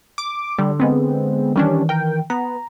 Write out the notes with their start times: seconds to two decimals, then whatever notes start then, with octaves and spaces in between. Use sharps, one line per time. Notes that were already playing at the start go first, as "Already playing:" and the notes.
0.18 D6
0.59 D3 G3
0.80 G#3 B3 C4
1.56 D#3 E3 G3 C#4 D4
1.89 A#4 G5
2.30 B3 A#5